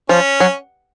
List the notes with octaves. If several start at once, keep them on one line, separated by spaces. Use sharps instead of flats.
F3 C#4
F#3